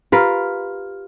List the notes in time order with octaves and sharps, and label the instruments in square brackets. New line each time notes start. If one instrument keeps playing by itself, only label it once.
[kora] F4 A#4 B4 [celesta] G4 F6